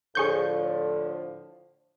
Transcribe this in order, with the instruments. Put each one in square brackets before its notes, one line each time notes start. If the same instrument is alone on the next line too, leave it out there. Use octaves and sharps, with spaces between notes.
[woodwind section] A2 D3 F3 [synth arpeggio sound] G#4 C#6 G6